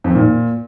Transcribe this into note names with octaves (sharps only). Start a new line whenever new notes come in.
F2
D#3
A#2